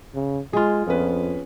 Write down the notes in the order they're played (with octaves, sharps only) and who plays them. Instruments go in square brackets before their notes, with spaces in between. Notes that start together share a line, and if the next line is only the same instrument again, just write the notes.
[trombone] C#3
[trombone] G#3 [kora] F4 G#4
[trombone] F2 [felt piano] B3 C#4 B4